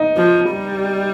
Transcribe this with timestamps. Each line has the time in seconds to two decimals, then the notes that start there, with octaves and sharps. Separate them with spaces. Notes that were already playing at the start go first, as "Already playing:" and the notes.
Already playing: D#4
0.17 F3
0.50 G3